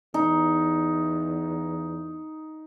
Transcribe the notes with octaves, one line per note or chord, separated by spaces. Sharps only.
E2 D#4